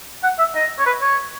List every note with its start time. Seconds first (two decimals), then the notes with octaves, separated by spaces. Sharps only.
0.24 F#5
0.39 E5
0.56 D#5
0.79 C#5
0.86 B4
1.01 C#5